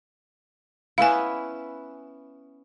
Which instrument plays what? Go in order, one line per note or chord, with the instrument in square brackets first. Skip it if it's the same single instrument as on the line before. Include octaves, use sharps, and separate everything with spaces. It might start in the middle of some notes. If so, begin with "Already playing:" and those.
[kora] B3 C#4 E4 [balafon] F5 G#5